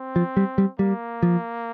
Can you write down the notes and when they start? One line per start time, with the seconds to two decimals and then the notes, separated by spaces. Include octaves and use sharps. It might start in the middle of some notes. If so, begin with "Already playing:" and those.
Already playing: C4
0.16 F3
0.37 G3
0.58 G3
0.79 G3 A#3
1.23 F3